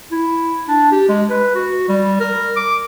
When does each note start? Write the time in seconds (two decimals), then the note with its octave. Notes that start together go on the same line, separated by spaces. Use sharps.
0.12 E4
0.68 D4
0.92 G4
1.09 G#3
1.30 B4
1.55 F#4
1.89 G3
2.20 A#4
2.56 D6